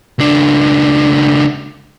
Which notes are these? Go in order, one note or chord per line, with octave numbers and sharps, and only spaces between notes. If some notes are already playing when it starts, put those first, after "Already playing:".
C#2 D4